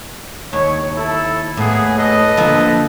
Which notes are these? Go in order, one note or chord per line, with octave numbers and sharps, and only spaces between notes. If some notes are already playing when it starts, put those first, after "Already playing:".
D#2 C#5
E4 A4
A2 A#3 B3 G#4
A4 B4 D#5
D3 F3 A#3